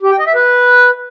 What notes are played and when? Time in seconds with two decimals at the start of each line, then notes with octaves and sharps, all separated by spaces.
0.02 G4
0.11 G5
0.19 D#5
0.27 E5
0.35 B4